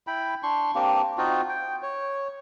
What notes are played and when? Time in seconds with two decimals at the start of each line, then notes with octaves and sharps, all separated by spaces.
0.07 E4 G5 B5
0.43 D4 C6 C#6
0.75 A#3 C4 D4 G4
1.18 C4 D#4 F4 F#4
1.49 G5
1.83 C#5